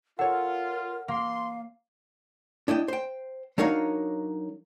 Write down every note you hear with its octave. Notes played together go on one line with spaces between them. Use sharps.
F4 A4 A#4 C#5 F#5
A#3 F5 C6
D4 E4 D#5 G5
C5 G5
F#3 D4 D#4 A#4 C#5 F5